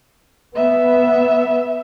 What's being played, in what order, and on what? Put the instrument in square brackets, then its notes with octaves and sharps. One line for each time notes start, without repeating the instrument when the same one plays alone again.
[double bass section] B3 [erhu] E5